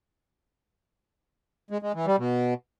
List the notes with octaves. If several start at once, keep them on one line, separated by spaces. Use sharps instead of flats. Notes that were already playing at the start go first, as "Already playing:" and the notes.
G#3
G#3
E3
G3
B2